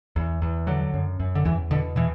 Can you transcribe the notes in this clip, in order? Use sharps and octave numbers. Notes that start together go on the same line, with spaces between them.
E2
E2
D3 F#3
F#2
F#2
D3
E2 E3
B2 D3
B2 E3